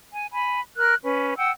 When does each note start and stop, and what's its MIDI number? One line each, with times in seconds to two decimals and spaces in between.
0.12 0.26 80
0.31 0.59 80
0.31 0.59 83
0.76 0.94 70
0.76 0.94 89
0.76 0.94 90
1.03 1.34 61
1.03 1.34 71
1.36 1.50 78
1.36 1.50 79
1.36 1.50 88